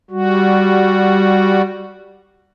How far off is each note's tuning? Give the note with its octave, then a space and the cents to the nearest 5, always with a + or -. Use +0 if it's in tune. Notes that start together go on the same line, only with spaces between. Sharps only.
G3 -5 F#4 +0